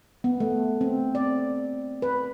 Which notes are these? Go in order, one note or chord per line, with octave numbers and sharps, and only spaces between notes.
B3
A3
C4
D5
B4